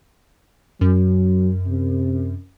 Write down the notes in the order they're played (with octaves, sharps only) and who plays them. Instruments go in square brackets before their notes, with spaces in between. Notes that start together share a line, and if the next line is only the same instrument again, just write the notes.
[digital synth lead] F#2 [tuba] F#3
[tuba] C3